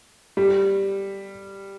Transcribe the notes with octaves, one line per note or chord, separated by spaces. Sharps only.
G3